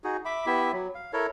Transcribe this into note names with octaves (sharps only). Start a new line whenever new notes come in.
D#4 F#4 G#4
E5 B5 D6
B3 E4 G4 E5
F#3
F5
E4 A4 A#4 C#5